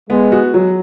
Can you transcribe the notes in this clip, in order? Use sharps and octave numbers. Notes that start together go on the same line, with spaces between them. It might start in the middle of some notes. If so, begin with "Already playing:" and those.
G#3 B3
F#4
F#3